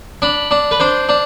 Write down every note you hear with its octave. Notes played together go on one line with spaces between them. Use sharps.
D4 B5
D4
B4
D4 C5
D4